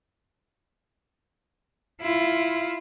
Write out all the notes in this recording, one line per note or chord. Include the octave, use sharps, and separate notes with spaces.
E4 F4